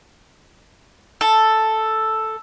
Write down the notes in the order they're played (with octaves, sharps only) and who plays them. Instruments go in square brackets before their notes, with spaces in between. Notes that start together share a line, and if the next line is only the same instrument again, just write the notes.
[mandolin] A4